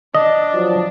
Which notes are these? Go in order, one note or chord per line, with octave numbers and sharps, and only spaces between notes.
D4 D#5
F3 F#3